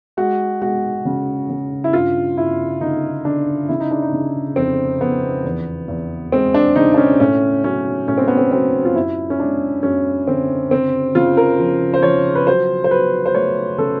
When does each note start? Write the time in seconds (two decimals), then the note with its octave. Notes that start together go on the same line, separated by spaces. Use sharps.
0.17 G#3 F#4
0.62 G#3 F#4
1.05 C#3
1.49 C#3
1.84 E4
1.93 G2 F4
2.37 G2 E4
2.81 D3 D#4
3.25 D3 D4
3.68 C#3 E4
3.80 D#4
3.91 D4
4.02 D#4
4.12 C#3
4.56 F2 C4
5.01 F2 B3
5.44 E2
5.88 E2
6.32 G#3 C4
6.54 D4
6.76 C#3 D#4
6.94 D4
6.98 C#4
7.20 A2 C#4
7.64 F#3 C#4
8.08 A2 C#4
8.18 C4
8.28 B3
8.37 C4
8.52 F#3 C4
8.85 F4
8.95 F#2 E4
9.30 C#4
9.39 G#3 D4
9.83 F#2 C#4
10.28 D3 C4
10.71 C#3 C4
11.15 C#3 F4
11.37 A#4
11.60 F3
11.94 C5
12.02 F3 C#5
12.35 B4
12.47 F#3 C5
12.84 C5
12.91 F#3 B4
13.26 C5
13.34 A3 C#5
13.78 C#3 A4